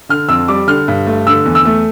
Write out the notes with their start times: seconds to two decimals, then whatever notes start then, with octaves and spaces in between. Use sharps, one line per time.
0.09 D3 F6
0.29 F2 E6
0.48 G3 D6
0.68 D3 F6
0.88 G2
1.07 A3
1.27 D3 E6
1.46 E2
1.55 E6
1.65 A3